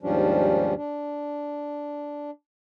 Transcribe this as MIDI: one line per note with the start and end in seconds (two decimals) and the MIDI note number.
0.03 0.74 39
0.03 0.74 44
0.03 0.74 53
0.03 0.74 55
0.03 0.74 61
0.03 0.74 62
0.76 2.31 62